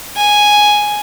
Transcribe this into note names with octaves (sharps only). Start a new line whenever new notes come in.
G#5